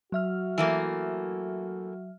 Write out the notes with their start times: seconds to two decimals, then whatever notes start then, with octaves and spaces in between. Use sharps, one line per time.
0.12 F#3 F#4 E5 F6
0.58 E3 A3 A#3